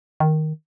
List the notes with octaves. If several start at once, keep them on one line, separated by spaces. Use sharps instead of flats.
D#3